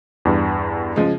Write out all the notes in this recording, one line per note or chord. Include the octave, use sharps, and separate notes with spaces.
E2 G2
C#3 F3 G#3